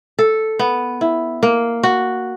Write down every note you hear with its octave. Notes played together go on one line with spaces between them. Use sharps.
A4
B3
E4
A#3
F#4